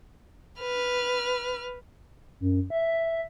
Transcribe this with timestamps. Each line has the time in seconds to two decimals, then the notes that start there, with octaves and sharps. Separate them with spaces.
0.60 B4 F6
2.40 F#2
2.70 E5